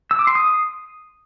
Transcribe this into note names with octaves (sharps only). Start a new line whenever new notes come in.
E6
D6
C6
D#6